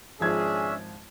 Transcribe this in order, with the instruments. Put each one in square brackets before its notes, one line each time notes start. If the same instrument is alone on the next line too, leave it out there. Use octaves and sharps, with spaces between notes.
[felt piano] G#1 F3 G#6 [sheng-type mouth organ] C#4 D4 E5 [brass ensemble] G#4